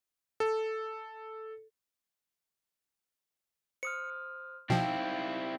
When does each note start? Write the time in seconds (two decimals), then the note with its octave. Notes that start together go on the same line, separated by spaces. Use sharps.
0.40 A4
3.83 C5 D#6 F6 C#7
4.70 B2 F3 C4 D#4 E4 F5 G5